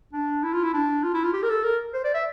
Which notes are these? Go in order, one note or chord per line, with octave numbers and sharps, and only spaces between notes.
D4
E4
F4
E4
D4
F4
E4
F4
G4
A#4
A4
A#4
C5
D5
E5